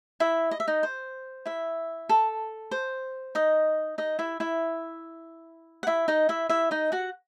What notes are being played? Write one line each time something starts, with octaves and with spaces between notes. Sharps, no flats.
E4 E5
D#5
E5
D#4 D#5
C5
E4 E5
A4
C5
D#4 D#5
D#4 D#5
E4 E5
E4 E5
F#5
E4 E5
D#4 D#5
E4 E5
E4 E5
D#4 D#5
F#4 F#5